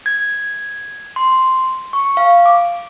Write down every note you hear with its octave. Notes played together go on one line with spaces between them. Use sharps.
G#6
C6
C#6
F5
D6